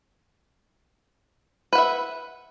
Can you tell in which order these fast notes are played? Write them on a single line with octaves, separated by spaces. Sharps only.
B4 F#5 E5